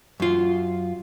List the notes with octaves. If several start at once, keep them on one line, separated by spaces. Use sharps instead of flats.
F#2 F4